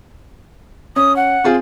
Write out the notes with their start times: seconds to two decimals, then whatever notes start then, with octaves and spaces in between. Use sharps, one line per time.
0.96 C#4 D#6
1.16 F#5
1.44 C4 F4 G#4